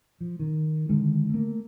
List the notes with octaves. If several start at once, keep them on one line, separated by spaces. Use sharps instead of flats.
F3
D#3
D3 D#3 G#3
A3 A#3